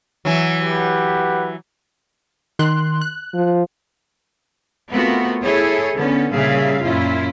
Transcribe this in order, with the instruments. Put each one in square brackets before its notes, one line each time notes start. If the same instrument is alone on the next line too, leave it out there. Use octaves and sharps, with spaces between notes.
[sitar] E3 F#3
[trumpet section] G4 B4 F#5
[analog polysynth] D#3 C6 F#6
F#6
[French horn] F3
[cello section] A3 B3 C4 F4 F#4 A#4
E4 G#4 A4 C#5
D3 B3 C#4
A#2 C#3 G3 G#4 E5 F5
F#2 A#2 C#4 E4 F4